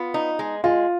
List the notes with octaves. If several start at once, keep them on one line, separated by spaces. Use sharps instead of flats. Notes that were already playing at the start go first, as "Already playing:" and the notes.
Already playing: B3 F4
D#4
G#3
G#3 F4